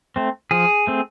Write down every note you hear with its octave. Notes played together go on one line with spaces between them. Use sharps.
A3 C4
F3 G#4
A3 C4